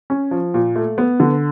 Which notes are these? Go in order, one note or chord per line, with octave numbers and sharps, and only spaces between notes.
C#4
F3
A#2
A3
B3
D3